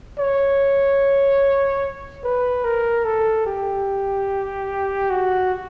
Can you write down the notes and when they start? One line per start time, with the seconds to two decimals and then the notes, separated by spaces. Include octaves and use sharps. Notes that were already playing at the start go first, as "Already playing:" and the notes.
0.18 C#5
2.24 B4
2.64 A#4
3.05 A4
3.46 G4
5.10 F#4